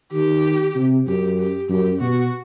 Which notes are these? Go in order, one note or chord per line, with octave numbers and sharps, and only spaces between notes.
D#3 G4
C3
F#2 G4
G4
F#2 G4
B2 F#4